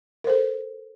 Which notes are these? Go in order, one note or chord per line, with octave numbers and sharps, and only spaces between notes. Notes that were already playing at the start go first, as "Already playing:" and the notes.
A4 A#4 C5